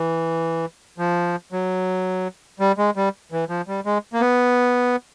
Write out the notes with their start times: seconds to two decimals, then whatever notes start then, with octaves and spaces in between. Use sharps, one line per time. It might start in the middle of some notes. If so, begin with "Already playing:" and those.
Already playing: E3
0.98 F3
1.52 F#3
2.60 G3
2.78 G#3
2.96 G3
3.32 E3
3.49 F3
3.68 G3
3.86 G#3
4.13 A#3
4.21 B3